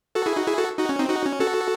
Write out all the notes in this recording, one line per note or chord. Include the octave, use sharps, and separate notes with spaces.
F#4 A4
E4 G#4
D#4 F#4
E4 G#4
F#4 A4
D#4 F#4
C#4
C4 D#4
D#4 F#4
C#4
F#4 A4